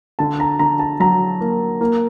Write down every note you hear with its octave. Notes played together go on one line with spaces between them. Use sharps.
D3 A5
A#5
D3 A#5
A5
F#3 A#5
A#3
A#3